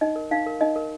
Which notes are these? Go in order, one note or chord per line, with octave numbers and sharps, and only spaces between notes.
D#4 D#5
A#4
D#4 F5
A#4
D#4 D#5
A#4